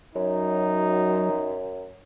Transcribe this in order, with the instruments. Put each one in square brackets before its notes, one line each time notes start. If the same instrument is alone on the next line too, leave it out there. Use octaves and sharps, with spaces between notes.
[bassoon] F#2 [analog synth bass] F#3 [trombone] D#4